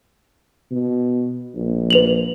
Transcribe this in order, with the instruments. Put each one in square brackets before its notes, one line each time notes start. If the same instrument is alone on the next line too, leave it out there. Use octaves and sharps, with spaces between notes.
[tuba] B2
A#1
[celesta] B4 F7 F#7